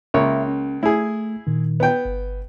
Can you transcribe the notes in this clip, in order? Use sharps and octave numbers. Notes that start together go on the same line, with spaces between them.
C#2 A#3 C#5 E5
C#4
A3 E4 G#4
A#2 D#3
B3 G5
G1